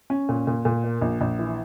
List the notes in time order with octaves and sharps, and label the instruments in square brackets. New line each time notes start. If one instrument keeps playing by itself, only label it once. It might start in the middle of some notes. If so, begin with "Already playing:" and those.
[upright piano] C#4
A#2
A#2
A#2
A#3
A#1
A#1
E3